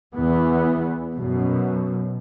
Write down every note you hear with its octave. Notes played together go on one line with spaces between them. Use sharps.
E2 E3 B3
F#2 B2